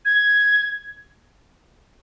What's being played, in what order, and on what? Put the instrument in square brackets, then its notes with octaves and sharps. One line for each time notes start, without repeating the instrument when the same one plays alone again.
[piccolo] G#6